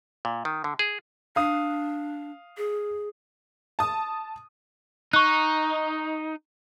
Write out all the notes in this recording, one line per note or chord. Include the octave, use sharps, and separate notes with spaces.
A#2
D#3
D3
G#4
D4 F5 D#6
G#4
A5 D#6
D#4 C#6 F#6